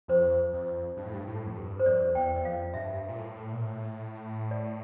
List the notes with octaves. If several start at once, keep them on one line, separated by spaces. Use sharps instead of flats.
F2 C5
F2
G2
A2
G2
A2
F2
G2
C5
F2 D5
E2 G5
E2
F2 F5
G2 E5
A#2
A2
A#2
A2
D5